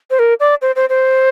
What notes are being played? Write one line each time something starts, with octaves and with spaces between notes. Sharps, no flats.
C5
A#4
D5
C5
C5
C5